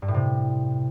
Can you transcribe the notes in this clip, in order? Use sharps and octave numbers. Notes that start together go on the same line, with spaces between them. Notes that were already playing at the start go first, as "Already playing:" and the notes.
G2
A2
C3